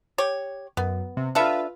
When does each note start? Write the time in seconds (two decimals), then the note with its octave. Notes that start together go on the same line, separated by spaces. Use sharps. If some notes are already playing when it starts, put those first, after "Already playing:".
0.18 G4 C#5
0.77 F#2 B3
1.17 C3
1.35 D4 F4 A4 B4 E5 F5